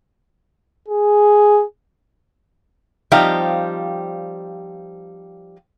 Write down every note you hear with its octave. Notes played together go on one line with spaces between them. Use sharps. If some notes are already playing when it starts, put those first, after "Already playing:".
G#4
F3 G3 C4 D#4 G4 F5